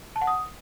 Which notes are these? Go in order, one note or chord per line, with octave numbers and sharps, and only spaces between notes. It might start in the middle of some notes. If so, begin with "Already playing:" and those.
A5
F#5
D#6